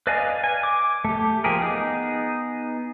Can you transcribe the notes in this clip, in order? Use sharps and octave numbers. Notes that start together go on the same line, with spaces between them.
B4 D5 D#5 F5 G#5
G#5
D6
A3 G4
F3 A#3 G4 G#4 A#4
B3 D#4 G#4